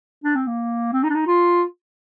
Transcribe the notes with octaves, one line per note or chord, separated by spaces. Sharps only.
D4
C4
A#3
C4
D#4
D4
D#4
F4